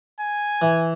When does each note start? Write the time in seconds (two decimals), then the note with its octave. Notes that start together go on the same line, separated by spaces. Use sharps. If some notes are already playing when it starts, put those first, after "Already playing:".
0.21 G#5
0.62 E3